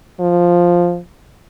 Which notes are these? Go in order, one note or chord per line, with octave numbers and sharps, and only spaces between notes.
F3